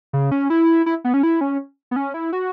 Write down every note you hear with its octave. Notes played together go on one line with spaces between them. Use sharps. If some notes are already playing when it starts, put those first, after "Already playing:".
C#3
C#4
E4
E4
B3
C#4
E4
C#4
B3
C#4
E4
F#4